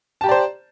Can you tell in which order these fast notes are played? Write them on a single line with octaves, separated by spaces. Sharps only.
A5 G4 A#5 D5 C5